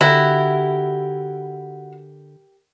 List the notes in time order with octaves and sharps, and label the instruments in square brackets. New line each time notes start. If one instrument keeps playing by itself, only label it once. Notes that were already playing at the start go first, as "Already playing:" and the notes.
[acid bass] D3 [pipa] E4 [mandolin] F#4 [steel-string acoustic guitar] G4 A#4